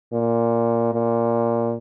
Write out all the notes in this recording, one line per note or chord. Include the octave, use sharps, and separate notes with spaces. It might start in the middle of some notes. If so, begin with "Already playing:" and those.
A#2
A#2